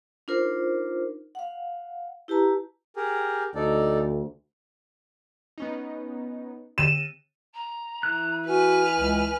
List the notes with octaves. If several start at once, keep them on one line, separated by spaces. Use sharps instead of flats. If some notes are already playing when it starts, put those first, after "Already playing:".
D4 D#4 F4 A#4 C5
F5 F#5
E4 G4 B4 A5 A#5
G4 G#4 A#4
D2 D#4 A4 D5
B3 C#4 D#4
D3 D#7 E7
A#5
E3 F#6
F#4 B4 G#5 F6
C#2